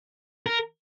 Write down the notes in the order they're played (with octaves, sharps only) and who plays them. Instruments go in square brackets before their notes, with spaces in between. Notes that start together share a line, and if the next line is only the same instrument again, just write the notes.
[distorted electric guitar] A#4